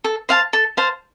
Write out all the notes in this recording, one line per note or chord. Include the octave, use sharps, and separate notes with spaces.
A4
C5 F5 A5
A4
C5 F5 A5